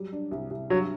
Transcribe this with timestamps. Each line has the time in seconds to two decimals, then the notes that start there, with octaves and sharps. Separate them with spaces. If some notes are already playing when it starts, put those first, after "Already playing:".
Already playing: F#3 G3
0.12 D4
0.31 C2
0.51 C2
0.70 G2 F#3